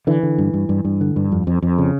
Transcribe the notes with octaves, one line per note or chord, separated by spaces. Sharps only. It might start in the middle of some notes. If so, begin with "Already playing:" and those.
D3 E3
D3
G2
G2
G2
G2
D3
G2
F2
F2
F2
C#3